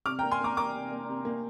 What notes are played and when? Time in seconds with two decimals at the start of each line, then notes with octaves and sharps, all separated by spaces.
0.06 C3 D6 F6
0.19 G5 A#5
0.23 A#3
0.31 G#5 C6
0.40 A#3 A#5 D6
0.57 A#3 A#5 D6
0.74 C3
0.91 A#3
1.09 C3
1.25 A#3